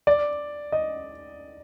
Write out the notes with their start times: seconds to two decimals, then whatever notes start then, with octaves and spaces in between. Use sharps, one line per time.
0.07 D5
0.72 D#5